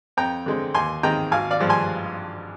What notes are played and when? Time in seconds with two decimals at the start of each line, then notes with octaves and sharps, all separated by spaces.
0.17 F2 G5 A#5
0.46 D3 G#3 C4
0.75 D#2 G#5 C6
1.03 D#3 G#3 C4 G5 A#5
1.31 G#1 F5 G#5
1.51 D5 F5
1.60 G2 F3 G#3
1.69 G#5 C6